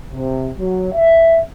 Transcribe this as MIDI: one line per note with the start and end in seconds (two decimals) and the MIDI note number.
0.12 0.49 48
0.59 0.90 54
0.93 1.39 76